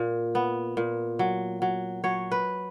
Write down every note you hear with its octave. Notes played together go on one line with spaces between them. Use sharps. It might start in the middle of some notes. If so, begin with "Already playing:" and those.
Already playing: A#2
B3
A#2
F#3
F#3
F#3 C#5
B4